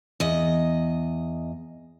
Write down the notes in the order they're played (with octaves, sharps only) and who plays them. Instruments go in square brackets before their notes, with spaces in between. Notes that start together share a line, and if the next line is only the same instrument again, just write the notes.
[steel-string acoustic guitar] E2 D#5